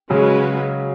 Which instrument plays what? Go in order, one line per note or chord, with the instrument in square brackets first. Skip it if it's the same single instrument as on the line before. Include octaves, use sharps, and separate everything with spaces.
[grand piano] C#3 F#3 [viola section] G#3 C#4 F#4 B4